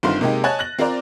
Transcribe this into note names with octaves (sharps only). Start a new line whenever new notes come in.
G1 D3 D#3 C4 F4 C6
C3 G#3 A#3 D#4 G4
C#5 D#5 G#5 A5 F#6 A6
F#6 A#6 F#7
C4 F4 A#4 C5 D5 A#5